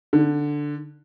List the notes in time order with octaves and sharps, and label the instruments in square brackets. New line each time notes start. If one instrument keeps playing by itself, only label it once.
[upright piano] D3